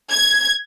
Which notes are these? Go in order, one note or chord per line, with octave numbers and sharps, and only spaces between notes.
G#6